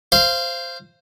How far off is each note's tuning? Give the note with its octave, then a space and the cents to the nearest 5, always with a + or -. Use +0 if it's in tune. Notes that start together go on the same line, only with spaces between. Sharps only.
C5 +0 F5 -20